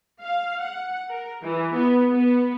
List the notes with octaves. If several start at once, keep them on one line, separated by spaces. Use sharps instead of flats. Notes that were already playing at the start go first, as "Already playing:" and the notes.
F5
F#5
A#4
E3
B3
B3